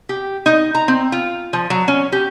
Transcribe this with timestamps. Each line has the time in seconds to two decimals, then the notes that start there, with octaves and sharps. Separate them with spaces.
0.09 G4
0.46 D#4
0.75 A#5
0.88 C4
1.12 F4
1.53 F3
1.70 F#3
1.88 C#4
2.12 G4